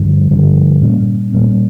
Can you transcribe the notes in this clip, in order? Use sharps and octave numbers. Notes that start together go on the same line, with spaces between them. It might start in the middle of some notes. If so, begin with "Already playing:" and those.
Already playing: G2 D3 F3
G2 D3 F3
A#2 G3 A#3 C#4
A#2 G3 A#3 C#4